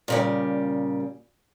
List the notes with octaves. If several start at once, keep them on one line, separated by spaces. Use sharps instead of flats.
A#2 C#3 G3